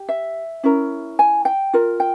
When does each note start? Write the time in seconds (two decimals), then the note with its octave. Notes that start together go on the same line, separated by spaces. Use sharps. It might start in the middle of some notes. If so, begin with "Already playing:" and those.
Already playing: G4
0.09 E5
0.64 C#4 E4 A#4
1.19 G#5
1.45 G5
1.74 F4 A#4
2.00 G5